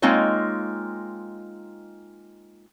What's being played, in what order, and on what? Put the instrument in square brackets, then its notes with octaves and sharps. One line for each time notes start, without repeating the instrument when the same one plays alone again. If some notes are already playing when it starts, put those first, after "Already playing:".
[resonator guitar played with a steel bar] G#3 A#3 C4 D#4 F4 C#5